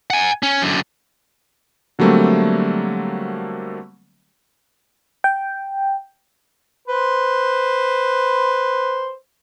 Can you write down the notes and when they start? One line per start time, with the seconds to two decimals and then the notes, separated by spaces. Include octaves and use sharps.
0.10 F#5 G#5
0.43 C#4
0.62 F#2 D3
1.99 D3 F#3 G3 A3 A#3 C4
5.24 G5
6.88 B4 C5